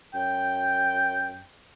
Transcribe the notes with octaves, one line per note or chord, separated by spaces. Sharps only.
F#2 G5